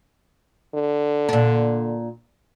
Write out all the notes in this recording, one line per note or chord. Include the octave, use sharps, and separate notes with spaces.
D3
A#2 D4